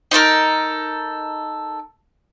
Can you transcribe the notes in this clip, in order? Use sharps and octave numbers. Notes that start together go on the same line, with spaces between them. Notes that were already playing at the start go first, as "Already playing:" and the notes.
D#4 F4 A4 A#4